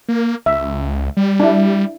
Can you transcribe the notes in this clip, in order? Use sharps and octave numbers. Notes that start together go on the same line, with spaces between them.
A#3
C#2 E5
G3
D4 E4